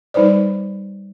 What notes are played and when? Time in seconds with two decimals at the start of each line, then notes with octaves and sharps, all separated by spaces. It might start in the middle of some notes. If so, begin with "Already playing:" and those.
0.14 G3 D#4 B4 C5 D5